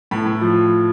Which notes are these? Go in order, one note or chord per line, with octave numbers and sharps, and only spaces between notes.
A2 B5
A2
F3